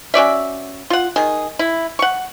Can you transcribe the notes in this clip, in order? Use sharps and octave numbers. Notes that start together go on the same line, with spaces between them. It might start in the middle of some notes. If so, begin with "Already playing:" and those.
C#4 F#4 D5 E5
F4 F#5
D#3 G#4
E4
F#5 C#6